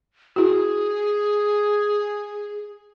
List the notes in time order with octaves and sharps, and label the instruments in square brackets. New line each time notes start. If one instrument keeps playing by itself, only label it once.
[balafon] E4 F#4 [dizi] G#4